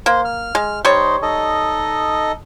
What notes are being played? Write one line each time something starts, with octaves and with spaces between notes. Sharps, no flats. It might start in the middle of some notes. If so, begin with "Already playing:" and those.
A#3 C5
F6
G#3
G3 D#4 C5 C#5
D#4 A4 D#5